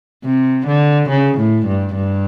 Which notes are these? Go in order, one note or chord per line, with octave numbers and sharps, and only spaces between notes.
C3
D3
C#3
A2
G2
G2